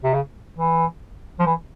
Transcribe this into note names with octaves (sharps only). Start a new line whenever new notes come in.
C3
C#3
E3
F3
E3